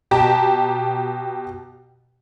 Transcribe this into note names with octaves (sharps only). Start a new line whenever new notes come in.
B2 G4 G5 A5 A#5